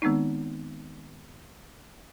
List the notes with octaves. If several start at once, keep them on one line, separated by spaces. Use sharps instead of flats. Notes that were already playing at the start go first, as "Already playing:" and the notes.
D#3 G#3 B3 C4 D#4